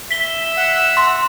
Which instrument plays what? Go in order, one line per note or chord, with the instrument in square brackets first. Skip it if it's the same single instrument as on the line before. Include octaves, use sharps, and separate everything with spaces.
[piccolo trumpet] E5 [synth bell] B6 G7
[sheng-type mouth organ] F#5 E6
[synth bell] C6